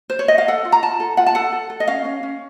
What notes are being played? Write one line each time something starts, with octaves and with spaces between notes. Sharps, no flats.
C5
C#5
D#5
F5
A4 F#5
F4
A#5
F4 A5
A4
F4 F#5
A5
A4 F#5
A4
A4
D#5
C#4 F5
C#4
C#4